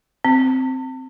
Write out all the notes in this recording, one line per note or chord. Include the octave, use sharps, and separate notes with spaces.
C4